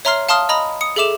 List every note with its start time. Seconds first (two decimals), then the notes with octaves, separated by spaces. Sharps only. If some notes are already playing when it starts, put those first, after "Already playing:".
0.05 C#5 E5 A#5 C6 F6 C7
0.29 F5 A5 C6 D#6 F6
0.49 D#5 A#5 B5 D#6
0.81 D#6 C#7
0.96 G#4 A4 E5 D6 E7 F7